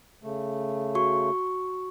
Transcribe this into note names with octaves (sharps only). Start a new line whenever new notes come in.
C#3 A3
F#4 C#6